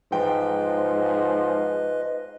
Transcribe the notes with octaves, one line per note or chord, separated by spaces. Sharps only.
G#2 F3 B4 D#5 G5